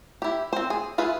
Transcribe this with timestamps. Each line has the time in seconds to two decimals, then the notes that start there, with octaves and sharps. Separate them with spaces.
0.22 E4 G4
0.53 C4 C5
0.70 G#4
0.98 E4 F4 G#4 B4 G#5